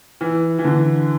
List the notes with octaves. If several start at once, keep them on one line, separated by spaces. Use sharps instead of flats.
E3
E3
D3